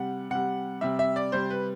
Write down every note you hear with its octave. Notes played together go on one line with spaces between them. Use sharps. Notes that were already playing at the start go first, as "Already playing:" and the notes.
Already playing: C3 G3 F#5
C3 G3 F#5
C3 G3 E5
E5
D5
C3 G3 C5
B4